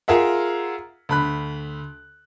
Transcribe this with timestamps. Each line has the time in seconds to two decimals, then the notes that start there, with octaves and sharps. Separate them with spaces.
0.08 F4 G#4 A#4 E5 F#5
1.09 D2 B5 F#6